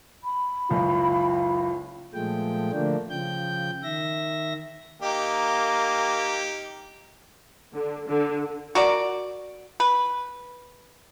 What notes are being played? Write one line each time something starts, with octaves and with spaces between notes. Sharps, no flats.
B5
F#1 C#2 F4
A#2 F3 G#3 A3 G5
D3 F3 A3 A#3 D4
C#3 F3 G5 G6
D#3 E5 A#6
A#3 D#4 G4
D3
D3
F#4 A#4 D5
B4